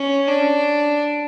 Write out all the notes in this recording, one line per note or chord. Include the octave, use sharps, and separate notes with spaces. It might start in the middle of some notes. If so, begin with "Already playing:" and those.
Already playing: C#4
D4